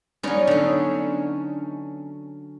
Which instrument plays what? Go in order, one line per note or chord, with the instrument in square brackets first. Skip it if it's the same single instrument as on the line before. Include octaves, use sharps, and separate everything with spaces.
[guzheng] F#3 C#4 [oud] B3 D#4 D5
[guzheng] D3 C#4